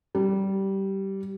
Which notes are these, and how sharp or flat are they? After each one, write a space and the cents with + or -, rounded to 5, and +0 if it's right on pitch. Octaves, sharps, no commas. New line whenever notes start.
G3 -15